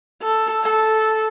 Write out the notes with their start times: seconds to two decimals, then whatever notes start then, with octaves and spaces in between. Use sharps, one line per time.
0.22 A4
0.63 A4